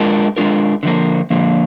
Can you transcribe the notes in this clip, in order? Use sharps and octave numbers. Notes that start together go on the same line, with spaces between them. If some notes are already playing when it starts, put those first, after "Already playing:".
Already playing: G#3 D4 F4 A#4
G#3 D4 F4 A#4
D3 F3 A#3
D3 F3 A#3